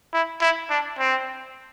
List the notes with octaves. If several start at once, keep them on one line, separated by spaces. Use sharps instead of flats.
E4
E4
D4
C4